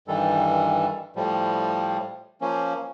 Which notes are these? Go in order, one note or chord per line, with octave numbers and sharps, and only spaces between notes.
G2 D#3 E3 G3 A4
A2 F3 G3
F3 A#3 C#4